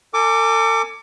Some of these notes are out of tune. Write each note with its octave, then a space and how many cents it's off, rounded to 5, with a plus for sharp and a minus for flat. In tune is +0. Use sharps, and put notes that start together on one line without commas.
A4 +45 G#5 +0 D6 +0